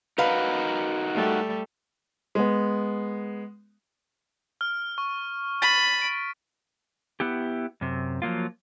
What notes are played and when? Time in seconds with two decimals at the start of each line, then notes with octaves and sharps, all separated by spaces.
0.18 D#4 F#4 A#4 B4 F5
1.15 G3 A3
2.35 G#3 B3
4.61 F6
4.98 C#6
5.62 B5 A6 B6 D#7
6.02 D7
7.20 B3 E4 G4
7.81 F#2 C3
8.22 F3 F#3 A#3 F4